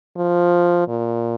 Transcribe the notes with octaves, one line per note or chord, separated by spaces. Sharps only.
F3
A#2